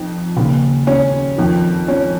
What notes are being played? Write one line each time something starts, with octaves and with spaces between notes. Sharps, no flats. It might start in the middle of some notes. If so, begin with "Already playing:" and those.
Already playing: F2 D#4
D#2 C#3
C#4
F2 D#3
C#4